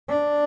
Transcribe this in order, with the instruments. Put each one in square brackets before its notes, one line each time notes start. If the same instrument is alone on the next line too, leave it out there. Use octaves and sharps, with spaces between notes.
[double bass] D4